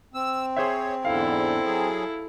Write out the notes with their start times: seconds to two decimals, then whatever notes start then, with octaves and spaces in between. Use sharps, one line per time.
0.14 C4 E6
0.56 G#4 C5 C#5 E5
1.05 E2 G#2 D3 E4 A4 F5
1.66 F#3 G#4